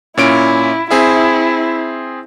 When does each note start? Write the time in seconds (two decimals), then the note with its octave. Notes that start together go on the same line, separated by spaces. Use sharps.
0.17 A#2 C#4 E4 D7
0.91 C4 E4 G#4 E5